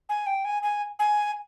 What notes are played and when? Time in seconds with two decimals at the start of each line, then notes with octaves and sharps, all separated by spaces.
0.09 G#5
0.27 G5
0.45 G#5
0.63 G#5
0.99 G#5